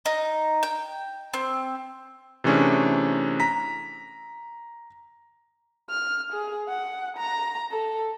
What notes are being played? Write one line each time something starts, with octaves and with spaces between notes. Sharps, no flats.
D#4
G5
C4
C3 E3 A3 C#4 D4 G#4
A#5 B6
F6
G#4
F#5
A#5
A4